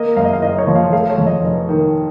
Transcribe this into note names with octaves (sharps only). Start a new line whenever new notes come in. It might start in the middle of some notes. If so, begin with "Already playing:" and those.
Already playing: A#3 D#5
F#2 F5
D#5
F5
F#1 D#5
C#5
F3
F5
A3 F5
C#5
F2
D#5
F1
D#3